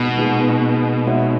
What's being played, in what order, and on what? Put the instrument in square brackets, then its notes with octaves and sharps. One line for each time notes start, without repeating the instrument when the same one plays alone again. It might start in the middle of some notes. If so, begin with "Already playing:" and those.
Already playing: [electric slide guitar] B2 [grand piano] G#3 D#4 G#4
[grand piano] A#2 G#3 D#4 G#4
G#3 D#4 F#4 C#5 E5